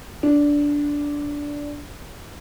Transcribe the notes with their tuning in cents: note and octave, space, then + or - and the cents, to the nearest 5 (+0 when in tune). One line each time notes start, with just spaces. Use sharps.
D4 -10